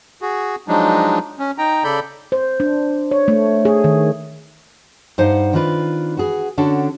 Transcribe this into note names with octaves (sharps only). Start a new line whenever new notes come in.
F#4 G#4
F3 F#3 G#3 D4 D#4
C#4
D#4 G5 A#5
C#3 A4 D5 B5 G6
C5
D4
C#5
A3
G#4
D#3
G2 D#4 C5 F5 F#5
D#3 C4 D4 F4 B4
F#4 G#4
D3 C#4 D4 F#4 A4